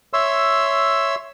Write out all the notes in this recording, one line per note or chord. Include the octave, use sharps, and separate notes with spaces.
C#5 E5 C6 E6